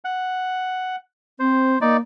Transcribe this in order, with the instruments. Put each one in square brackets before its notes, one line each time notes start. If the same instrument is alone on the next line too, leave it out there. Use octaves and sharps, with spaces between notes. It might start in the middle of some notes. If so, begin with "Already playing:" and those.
[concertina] F#5
[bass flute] C4 [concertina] C5
[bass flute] A#3 [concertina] D#4 D5